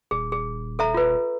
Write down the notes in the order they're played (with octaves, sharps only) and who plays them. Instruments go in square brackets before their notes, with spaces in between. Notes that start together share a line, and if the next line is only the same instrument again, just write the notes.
[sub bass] D#1 [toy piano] G#4
[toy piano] G#4
A4 E5 A#5
F4 B4